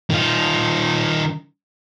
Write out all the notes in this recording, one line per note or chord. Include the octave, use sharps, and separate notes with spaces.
D#3 F4